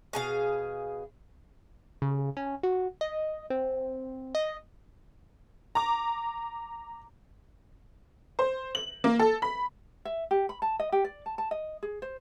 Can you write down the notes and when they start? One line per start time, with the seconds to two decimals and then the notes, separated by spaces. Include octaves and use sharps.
0.13 B2 G#4 F5
2.02 C#3
2.37 C#4
2.63 F#4
3.01 D#5
3.50 C4
4.35 D#5
5.75 A#5 D6
8.39 C5
8.75 F#7
9.04 A#3
9.19 A4
9.42 B5
10.05 E5
10.31 G4
10.49 B5
10.62 A5
10.80 D#5
10.92 G4
11.04 D5
11.26 A5
11.38 A5
11.51 D#5
11.83 G#4
12.02 C5